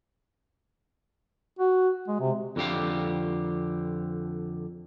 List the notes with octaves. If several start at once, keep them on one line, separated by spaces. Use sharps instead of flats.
F#4
G#3
C3
F2 D3 G4 F5